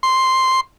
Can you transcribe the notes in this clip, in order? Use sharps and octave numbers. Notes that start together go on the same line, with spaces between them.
C6